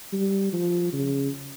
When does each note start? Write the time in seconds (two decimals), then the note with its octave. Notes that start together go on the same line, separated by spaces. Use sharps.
0.13 G3
0.53 F3
0.93 C#3